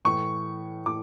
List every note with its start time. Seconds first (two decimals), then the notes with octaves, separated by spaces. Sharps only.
0.05 A2 E3 C#6
0.86 A2 E3 D6